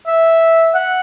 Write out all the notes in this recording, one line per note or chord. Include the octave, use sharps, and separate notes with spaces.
E5
F#5